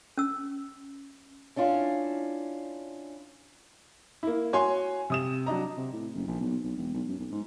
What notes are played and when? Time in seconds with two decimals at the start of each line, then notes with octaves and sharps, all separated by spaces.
0.17 C#4 E6
1.56 C#4 D4 E4 F4
4.23 A#3 E4
4.53 F#4 C#5 G#5 C6
5.10 C3 D#6 E7
5.46 F#3 D4 D#5 A#5
5.77 C3
5.92 A2
6.14 F#1
6.27 A#1
6.40 B1
6.64 B1
6.77 E1
6.94 B1
7.07 F#2
7.19 B1
7.32 G#2